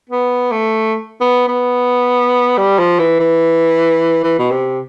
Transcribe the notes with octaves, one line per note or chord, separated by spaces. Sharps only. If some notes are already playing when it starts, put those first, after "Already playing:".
B3
A3
B3
B3
G3
F3
E3
E3
E3
B2
C3